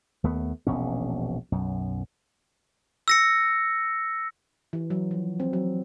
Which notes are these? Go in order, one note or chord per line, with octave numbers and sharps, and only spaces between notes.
D#2 A3 B3
E1 A#1 B2 C#4
B1 F#2
E6 A#6 C#7
E3
F#3
F3
C4
F#3